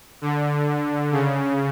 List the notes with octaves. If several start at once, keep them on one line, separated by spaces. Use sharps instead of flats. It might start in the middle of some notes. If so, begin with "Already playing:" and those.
D3
C#3